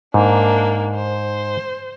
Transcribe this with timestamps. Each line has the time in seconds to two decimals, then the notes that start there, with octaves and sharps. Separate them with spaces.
0.14 G#2 A#3 D4
0.96 C5